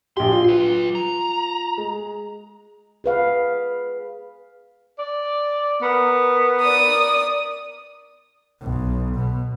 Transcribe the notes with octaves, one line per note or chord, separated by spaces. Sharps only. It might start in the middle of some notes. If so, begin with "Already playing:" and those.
A#1 G4 C6
F4
F#3 B4
A#5
G#3
G#4 B4 F5
D5
B3 A#4
D5 D#6
B1
B2